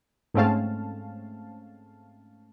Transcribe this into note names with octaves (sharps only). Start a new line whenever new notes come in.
G#2 A3 C4 C#4 F5 A5